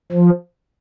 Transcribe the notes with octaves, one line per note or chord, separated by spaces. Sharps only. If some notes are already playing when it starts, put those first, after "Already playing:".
F3